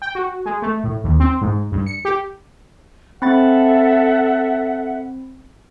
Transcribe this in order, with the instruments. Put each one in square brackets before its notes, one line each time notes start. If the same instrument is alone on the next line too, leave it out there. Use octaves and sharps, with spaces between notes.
[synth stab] G5
F#4
G#3
A3
A2
D#2
C4
G#2
G2
C#7
G4
[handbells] C4 B5 A6 [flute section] A4 E5 F#5